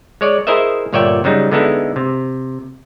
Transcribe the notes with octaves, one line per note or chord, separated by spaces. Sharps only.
G#3 C#5 D5
E4 G#4 A#4 C5 D#5 E5
G1 A#2 C#5 D5 E5 G5
C#3 F#3 G3 D#4
D3 G#3 B3 D#4 E4 A4
C3